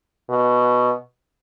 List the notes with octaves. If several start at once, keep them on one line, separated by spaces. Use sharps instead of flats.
B2